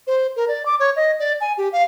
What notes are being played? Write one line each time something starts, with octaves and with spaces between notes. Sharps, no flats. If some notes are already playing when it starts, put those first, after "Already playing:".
C5
A#4
D5
D6
C#5
D#5
D5
G#5
G4
F5